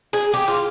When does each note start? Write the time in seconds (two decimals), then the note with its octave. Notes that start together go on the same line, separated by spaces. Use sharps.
0.13 G#4
0.33 G4
0.48 F4